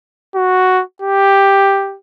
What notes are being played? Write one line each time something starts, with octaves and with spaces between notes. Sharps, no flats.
F#4
G4